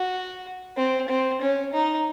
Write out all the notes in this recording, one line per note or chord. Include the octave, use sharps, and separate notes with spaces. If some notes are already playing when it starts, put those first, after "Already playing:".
Already playing: F#4
C4
C4
C#4
D#4